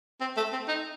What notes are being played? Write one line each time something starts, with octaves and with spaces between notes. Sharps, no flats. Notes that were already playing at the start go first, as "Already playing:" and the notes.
C4
A3
C4
D#4